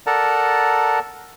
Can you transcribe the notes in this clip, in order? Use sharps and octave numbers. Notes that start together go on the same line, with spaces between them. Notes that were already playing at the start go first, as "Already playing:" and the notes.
A4 A#4 D5 F#5 A5 A#5